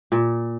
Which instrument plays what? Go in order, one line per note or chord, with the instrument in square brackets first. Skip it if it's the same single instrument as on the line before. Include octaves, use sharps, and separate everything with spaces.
[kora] A#2